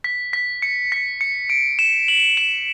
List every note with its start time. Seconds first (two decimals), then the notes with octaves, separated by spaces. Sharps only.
0.04 B6
0.33 B6
0.62 C#7
0.92 B6
1.21 C#7
1.50 D7
1.79 E7
2.08 F#7
2.37 E7